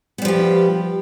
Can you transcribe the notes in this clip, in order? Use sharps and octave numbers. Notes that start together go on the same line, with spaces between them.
F3 G3 B3 G4